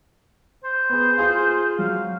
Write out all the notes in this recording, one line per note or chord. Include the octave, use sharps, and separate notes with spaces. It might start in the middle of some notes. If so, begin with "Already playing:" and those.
C5
B3 G#4
F4 G#4 F5
F#3 F5